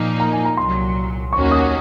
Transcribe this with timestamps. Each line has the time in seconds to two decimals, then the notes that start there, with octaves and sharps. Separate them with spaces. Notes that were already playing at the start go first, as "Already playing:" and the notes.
Already playing: A#2 F3 A#3 D#4
0.20 A#5
0.32 G#5
0.45 A#5
0.57 C2 A#2 F#3 C6
1.33 D#2 D#3 A#3 C#4 F#4 C#6
1.51 D#6